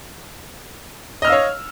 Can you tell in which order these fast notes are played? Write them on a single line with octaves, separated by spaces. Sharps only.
D#5 F6 E6 F5 C#5